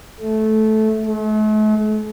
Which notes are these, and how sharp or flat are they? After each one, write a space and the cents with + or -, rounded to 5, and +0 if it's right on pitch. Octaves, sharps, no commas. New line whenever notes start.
A3 -15
A3 -45